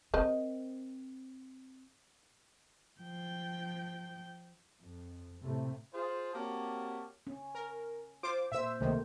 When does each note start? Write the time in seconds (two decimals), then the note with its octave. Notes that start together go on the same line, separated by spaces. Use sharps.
0.14 C4 A#4 C5 D#5
3.01 F3 G5
4.82 F2
5.42 A2 C3 A3
5.93 F4 G#4 C5
6.33 A#3 C4 F#4 G4 C#5 A5
7.27 C#4
7.55 A#4
8.23 F4 C5 D6
8.52 A#2 C5 E5 E6
8.81 C#2 C3 D#3 A3 A#3